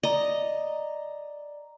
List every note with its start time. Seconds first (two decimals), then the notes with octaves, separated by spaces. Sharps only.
0.03 D5 D#5 A#5